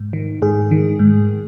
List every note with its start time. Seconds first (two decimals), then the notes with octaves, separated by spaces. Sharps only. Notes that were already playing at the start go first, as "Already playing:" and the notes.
Already playing: G#2
0.13 D#3
0.42 G#2 G#4
0.71 D#3
0.99 G#2